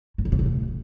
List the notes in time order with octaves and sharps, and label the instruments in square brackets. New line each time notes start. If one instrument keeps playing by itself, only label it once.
[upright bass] A2
C#3
C3
C#3
A2